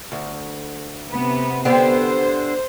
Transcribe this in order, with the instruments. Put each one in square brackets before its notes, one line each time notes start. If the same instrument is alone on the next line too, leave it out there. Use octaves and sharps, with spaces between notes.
[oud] D2
[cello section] C3 B3
[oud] D3 B3 G4 [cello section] C5